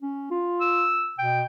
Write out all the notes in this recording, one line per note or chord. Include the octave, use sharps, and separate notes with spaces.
C#4
F4
E6
B2 G5